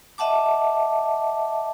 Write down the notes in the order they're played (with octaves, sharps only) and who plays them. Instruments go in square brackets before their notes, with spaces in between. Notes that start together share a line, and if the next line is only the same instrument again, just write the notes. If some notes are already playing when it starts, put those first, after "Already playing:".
[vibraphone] D#5 E5 F#5 A5 D6